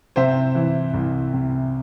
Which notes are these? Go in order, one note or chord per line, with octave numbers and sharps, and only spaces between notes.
C3 C5 E5
E3
C2
C3